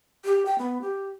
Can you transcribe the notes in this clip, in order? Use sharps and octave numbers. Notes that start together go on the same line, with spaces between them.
G4
G5
B3
G4